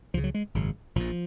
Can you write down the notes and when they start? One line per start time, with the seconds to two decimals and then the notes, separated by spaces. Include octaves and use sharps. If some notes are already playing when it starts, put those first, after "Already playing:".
0.14 C#2 F3
0.17 C#3
0.24 F#3
0.34 G#3
0.55 G#1 F#2 C#3
0.96 A#1 A#2 F3